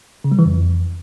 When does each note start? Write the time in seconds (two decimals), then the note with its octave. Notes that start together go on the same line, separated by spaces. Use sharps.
0.24 C#3
0.32 G3
0.39 E3
0.46 F2